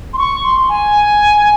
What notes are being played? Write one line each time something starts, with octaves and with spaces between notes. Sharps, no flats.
C6
C#6
C6
G#5